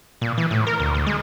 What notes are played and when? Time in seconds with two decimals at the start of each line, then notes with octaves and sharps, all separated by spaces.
0.21 A#2
0.38 E3
0.51 A2
0.67 A#4
0.80 D2
0.95 D2
1.07 G#3